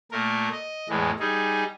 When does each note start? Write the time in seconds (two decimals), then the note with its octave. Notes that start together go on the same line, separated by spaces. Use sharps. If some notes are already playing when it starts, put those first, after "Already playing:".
0.12 A#2 A3 A#4
0.52 D#5
0.89 E2 A2 E3 G#3
1.19 G3 D#4 G#4